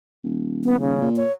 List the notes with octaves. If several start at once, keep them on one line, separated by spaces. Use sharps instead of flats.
D#1
B3
C#3
A#2
C#5